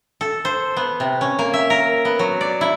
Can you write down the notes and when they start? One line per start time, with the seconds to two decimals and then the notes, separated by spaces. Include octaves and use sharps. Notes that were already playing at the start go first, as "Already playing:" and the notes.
0.21 A4
0.45 C5
0.77 B3
1.00 C3
1.21 C#4
1.39 A#3
1.53 E5
1.70 A#4
2.05 B3
2.19 F#3
2.41 D5
2.61 E4